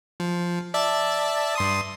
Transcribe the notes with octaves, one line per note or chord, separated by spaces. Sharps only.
F3
D5 E5 A5
G2 C6 D#6